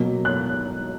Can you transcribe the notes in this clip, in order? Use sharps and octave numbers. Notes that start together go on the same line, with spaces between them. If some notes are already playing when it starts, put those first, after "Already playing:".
Already playing: B2 F#3 A#3
F#6